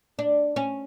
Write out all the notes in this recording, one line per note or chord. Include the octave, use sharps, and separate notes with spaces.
D4
C#4